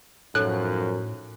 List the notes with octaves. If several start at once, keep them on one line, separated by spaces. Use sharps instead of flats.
F#2 A2 F3 D#4 A4 C#5 F#6